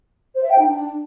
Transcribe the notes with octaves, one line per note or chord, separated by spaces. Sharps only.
C5
E5
G5
D#4
D4